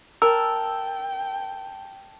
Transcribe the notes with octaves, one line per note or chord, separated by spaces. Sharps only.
A#4 G5 A5 E6